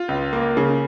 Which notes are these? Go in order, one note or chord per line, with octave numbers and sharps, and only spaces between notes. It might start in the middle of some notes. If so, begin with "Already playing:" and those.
Already playing: F4
C#2
A#3
C#3